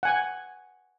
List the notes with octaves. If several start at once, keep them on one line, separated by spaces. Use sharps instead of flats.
F#5 G#5